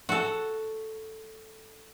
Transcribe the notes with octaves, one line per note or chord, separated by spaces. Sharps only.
F#4 A4